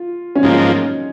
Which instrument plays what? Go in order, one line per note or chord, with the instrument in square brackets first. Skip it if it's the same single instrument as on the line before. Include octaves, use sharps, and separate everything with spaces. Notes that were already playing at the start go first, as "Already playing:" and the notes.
Already playing: [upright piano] F4
C#4
[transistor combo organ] G#2 F3 A#3 [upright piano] D#4